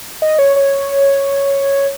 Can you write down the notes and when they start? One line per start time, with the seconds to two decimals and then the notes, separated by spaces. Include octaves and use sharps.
0.22 D#5
0.39 C#5
0.56 C#5